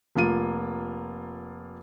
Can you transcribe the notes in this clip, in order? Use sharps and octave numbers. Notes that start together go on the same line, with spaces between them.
F1 A#3 F4 D#7